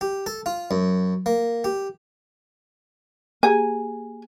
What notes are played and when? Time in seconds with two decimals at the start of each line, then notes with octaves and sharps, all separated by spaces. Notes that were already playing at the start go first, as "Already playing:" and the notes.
0.01 G4
0.26 A4
0.46 F4
0.71 F#2
1.26 A#3
1.64 G4
3.43 A#3 G4 G#4 G#5